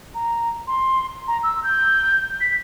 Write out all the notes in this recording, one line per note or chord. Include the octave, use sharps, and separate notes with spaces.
A#5
C6
A#5
E6
G6
B6